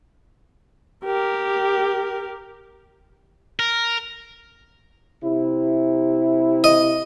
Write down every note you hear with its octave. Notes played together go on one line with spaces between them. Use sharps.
G4 A#4
A#4
C3 E4
D#5